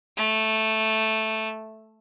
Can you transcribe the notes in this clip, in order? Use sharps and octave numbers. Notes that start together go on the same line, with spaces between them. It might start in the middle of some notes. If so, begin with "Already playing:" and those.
A3